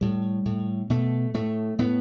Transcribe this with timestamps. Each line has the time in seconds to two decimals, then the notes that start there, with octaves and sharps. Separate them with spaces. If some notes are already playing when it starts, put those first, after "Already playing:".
0.01 A2 G3
0.45 A2
0.90 B2 A3
1.34 A2 A3
1.79 A2 B3